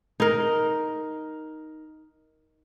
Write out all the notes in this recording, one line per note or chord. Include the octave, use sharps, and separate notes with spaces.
D#4 A#4